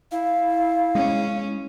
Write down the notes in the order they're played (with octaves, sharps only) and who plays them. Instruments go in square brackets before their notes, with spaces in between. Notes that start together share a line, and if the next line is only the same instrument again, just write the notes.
[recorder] E4 [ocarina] F5
[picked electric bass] G#3 [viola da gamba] C#4